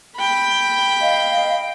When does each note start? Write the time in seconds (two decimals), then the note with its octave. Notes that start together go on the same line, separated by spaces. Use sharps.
0.16 G5 B5
1.01 D#5 F5